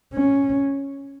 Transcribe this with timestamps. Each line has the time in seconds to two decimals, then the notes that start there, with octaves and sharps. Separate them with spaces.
0.14 C#4